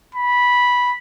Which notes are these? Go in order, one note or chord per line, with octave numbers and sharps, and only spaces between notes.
B5